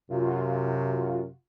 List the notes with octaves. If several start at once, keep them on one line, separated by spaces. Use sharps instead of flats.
F#2 C3 F4 F#4